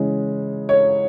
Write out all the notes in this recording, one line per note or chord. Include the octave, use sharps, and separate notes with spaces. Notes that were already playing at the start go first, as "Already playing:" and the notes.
Already playing: C#3 E3 G#3
C#5